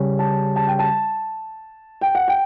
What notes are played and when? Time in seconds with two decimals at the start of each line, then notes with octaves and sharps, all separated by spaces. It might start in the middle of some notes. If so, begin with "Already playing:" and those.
Already playing: C#3 G3 C#4
0.19 A5
0.56 A5
0.67 G5
0.79 A5
2.01 G5
2.15 F#5
2.28 G5